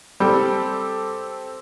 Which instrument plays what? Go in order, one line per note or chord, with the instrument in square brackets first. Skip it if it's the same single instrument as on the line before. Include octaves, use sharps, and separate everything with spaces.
[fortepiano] G3 [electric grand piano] C4 G4 A4